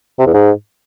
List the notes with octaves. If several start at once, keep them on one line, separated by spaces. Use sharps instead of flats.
C3
E2
G#2